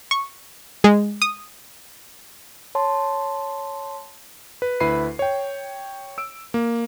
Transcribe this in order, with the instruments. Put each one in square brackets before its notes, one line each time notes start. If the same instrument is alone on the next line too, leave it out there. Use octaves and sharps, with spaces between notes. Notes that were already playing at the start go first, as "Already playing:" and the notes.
[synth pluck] C#6
G#3
D#6
[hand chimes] C#5 A5 C6
[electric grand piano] B4
D2 E4 B4 B5 C7 D#7
C#5 G5
E6 D7
A#3